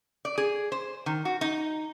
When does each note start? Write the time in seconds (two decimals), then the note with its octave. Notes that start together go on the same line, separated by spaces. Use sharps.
0.25 D5
0.38 G#4
0.72 C5
1.06 D#3
1.25 F#4
1.41 D#4